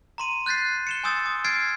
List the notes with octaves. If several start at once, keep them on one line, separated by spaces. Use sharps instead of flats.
A#5 C6 D#7
F#6 G6 A6 B6 C7
C#7 E7 G7
G#5 C6 D#6 E6 G6 A6
D#6
F6 G#6 A6 C7 D7